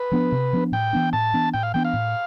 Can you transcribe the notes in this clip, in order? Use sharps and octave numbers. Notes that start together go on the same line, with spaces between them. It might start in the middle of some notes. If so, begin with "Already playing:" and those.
Already playing: B4
F3 B3 D4
C3
F3 B3 D4
A2 G5
E3 B3 D4
A2 A5
E3 B3 D4
A2 G5
F5
E3 B3 D4 G5
F5
A2